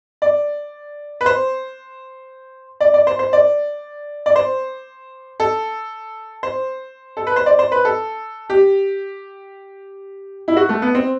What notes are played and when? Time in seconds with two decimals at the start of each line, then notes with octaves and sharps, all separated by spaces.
0.22 D5
1.21 B4
1.26 C5
2.80 D5
2.94 D5
3.07 C5
3.19 C5
3.33 D5
4.26 D5
4.36 C5
5.40 A4
6.43 C5
7.17 A4
7.27 B4
7.36 C5
7.46 D5
7.59 C5
7.72 B4
7.85 A4
8.50 G4
10.48 E4
10.57 F#4
10.69 A3
10.82 B3
10.95 C4